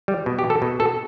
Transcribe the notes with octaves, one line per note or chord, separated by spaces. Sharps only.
G3
B2
G4
A4
B2
A4